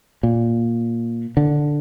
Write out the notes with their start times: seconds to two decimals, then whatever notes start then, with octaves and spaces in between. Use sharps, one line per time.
0.23 A#2
1.37 D3